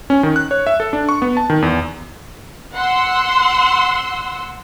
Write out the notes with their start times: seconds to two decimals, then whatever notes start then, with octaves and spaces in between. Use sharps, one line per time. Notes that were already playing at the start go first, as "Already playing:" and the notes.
0.10 C#4
0.23 D#3
0.36 F#6
0.51 C#5
0.67 E5
0.80 A4
0.93 D4
1.09 C#6
1.22 B3
1.37 A5
1.50 D#3
1.62 E2
2.73 F#5 C6 E6